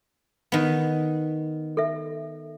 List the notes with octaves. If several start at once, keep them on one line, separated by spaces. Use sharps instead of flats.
D#3 B3
A4 E5